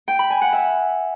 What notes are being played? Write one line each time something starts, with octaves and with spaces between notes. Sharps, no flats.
G5
B5
G#5
F#5
E5